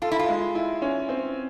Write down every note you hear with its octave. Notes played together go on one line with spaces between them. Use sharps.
F4 A4
E4
F4
G#3
E4
C#4
C4